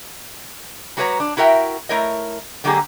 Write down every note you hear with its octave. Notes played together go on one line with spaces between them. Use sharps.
G3 F#4 G#4 B4 C#5 A#5
D4
E4 F#4 A#4 E5 G5
A3 E4 A#4 C#5 D#5
D3 F#3 G#3 A#3 G4 G#4